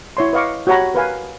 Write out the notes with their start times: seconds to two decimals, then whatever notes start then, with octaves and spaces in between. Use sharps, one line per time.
0.17 E4 C#5 C6
0.33 B4 D#5 F5 C#6 D6
0.67 F#4 G4 C#5 F#5 A#5 B5
0.94 A#4 B4 F5 G#5